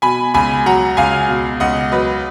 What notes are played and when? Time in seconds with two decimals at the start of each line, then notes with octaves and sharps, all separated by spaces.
0.02 B2 G#5 B5
0.34 C#2 G#5 B5
0.66 F#3 F#5 A#5
0.97 C#2 F5 G#5
1.28 B2
1.60 C#2 D#5 F#5
1.92 F#3 B4 D#5